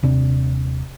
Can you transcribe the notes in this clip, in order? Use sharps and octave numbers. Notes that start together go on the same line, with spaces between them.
D#1 C3 D4